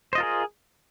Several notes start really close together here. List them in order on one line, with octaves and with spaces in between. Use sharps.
C5 D#5 F4 A#4 G#4